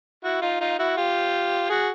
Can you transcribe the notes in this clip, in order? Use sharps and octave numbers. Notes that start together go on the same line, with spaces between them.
E4 F#4
D#4 F4
D#4 F4
E4 F#4
F4 G4
F#4 G#4